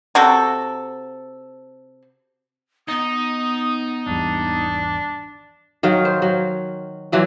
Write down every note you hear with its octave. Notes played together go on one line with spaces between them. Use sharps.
C3 F#4 A4
B3 D#4 D#6
G#1 E2 G3 D4
D#3 F#3 F5
C5
F#3
A#2 E3 F#3